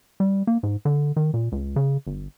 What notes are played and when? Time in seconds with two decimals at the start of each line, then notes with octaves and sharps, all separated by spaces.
0.20 G3
0.47 A#3
0.63 G#2
0.85 D3
1.16 D#3
1.34 A#2
1.52 C#2
1.76 C#3
2.07 G1